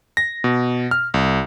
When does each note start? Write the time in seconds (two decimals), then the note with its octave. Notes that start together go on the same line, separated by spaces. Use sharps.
0.17 A#6
0.44 B2
0.91 F6
1.14 C2